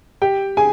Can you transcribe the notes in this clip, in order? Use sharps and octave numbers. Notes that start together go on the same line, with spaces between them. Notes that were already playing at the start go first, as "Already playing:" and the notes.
G4 G5
G#4 G#5